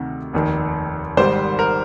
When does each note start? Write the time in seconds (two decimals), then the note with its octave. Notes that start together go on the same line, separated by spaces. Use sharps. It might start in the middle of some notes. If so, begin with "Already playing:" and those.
Already playing: D2 C3 D#3
0.33 F1 D#2 D#3
1.17 G#1 G#2 D#3 G3 C5
1.59 A#4